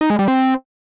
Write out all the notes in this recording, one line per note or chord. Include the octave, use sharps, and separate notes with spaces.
D#4
G#3
G3
C4